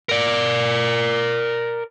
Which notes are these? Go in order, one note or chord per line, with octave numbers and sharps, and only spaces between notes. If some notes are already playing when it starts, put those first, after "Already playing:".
A#4 D5